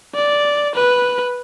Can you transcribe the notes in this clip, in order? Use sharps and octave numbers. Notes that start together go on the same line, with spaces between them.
D5
B4